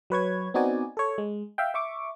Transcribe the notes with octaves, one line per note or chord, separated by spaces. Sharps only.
F#3 B4 C#5 G#6
B3 C4 D#4 F#4 D5 G#5
A4 C#5
G#3
E5 F5 G5
E5 C#6 D6